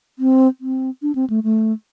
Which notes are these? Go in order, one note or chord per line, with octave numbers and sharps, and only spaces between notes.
C4
C4
D4
C4
A3
A3